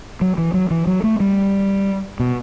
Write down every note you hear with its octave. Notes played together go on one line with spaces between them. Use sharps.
F#3
E3
F#3
E3
F#3
A3
G3
B2